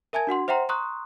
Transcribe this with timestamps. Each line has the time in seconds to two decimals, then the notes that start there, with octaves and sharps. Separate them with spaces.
0.13 A#4 E5 G#5 A5 G#6
0.27 D4 F#4 F#5 C6
0.48 C5 E5 F#5 G5 A#5 C6
0.69 A#5 C6 C#6 D#6 F#6